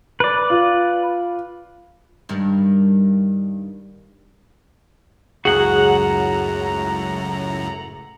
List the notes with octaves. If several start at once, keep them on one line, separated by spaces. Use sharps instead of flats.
B4 D5
F4
G2 D#3
C#2 F#2 A2 F#4 G#4 F#5 A#5